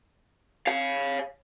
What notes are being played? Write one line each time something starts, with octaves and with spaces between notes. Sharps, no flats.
C#5 F5